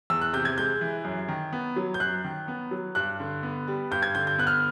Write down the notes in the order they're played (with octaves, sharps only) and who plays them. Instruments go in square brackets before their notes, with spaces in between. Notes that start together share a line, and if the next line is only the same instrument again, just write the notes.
[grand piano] E2 E6
F#6
C3 G6
G#6
G#3 G6
E3
F#2
D#3
B3
F#3
G6
F#2 F#6
D#3
B3
F#3
G2 F#6
D3
B3
G3
G2 G6
G#6
D3 G6
G6
B3 F#6
F6